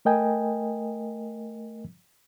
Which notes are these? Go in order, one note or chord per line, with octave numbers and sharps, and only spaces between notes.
A3 A#4 D#5 G5 G#5